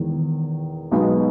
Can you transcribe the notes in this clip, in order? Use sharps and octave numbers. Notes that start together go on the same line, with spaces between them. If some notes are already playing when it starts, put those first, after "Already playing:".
Already playing: E1 E2 D#3
B1 B2 G#3 B3 D#4